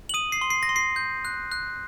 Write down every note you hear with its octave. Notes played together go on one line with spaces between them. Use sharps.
F#7
D#6 D#7
C7
C6
C7
A#6
C6
C7
G6
F#6
F#6